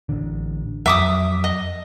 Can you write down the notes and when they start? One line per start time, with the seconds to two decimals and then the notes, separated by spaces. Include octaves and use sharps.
0.09 A1 D3
0.86 F2 F#3 E5 D6 D#6
1.44 D#5